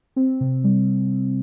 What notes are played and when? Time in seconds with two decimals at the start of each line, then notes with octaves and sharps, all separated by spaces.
0.16 C4
0.41 C3
0.64 G3